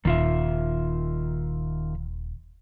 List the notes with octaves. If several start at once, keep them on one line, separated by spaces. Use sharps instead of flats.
D#1 D#3 F4 E5